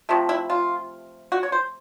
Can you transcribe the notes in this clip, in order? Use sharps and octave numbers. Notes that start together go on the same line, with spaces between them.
C3 F3 A3
E4
F4
F#4
C#5
C5